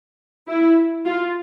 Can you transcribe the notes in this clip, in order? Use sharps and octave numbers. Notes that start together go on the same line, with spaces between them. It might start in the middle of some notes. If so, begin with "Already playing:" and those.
E4
F4